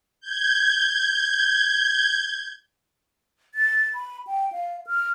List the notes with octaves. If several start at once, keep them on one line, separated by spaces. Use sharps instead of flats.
G6 G#6
A6
B5
G5
F5
F6